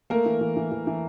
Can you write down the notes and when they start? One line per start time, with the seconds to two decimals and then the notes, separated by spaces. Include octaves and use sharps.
0.10 A3 A#3 A#4
0.26 E3
0.41 E3
0.57 E3
0.71 E3
0.87 E3